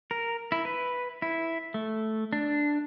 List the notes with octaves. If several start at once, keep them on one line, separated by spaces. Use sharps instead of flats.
A#4
E4
B4
E4
A3
D4